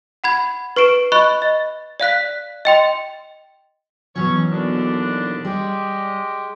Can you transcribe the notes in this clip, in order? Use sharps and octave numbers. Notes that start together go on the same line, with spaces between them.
F#5 B5 G#6
B4 C#6 C7 D7 E7
D#5 B5 C#6 F#6
D#5 A6
D5 F5 F#6 B6
D#5 G5 C6
B2 E3 F#3 C#4 F#4 C#5
D#2 D3 D4
G3 G#3 G4 D5